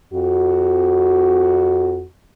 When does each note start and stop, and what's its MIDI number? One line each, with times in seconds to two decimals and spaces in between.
0.14 2.06 41
0.14 2.06 66